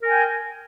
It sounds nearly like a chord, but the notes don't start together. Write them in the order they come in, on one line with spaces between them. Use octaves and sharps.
A#4 G#5 G5